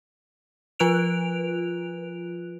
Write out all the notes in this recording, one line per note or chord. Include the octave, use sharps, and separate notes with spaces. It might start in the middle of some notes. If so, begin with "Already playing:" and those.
F3 F4 B4 F#6 D7 F7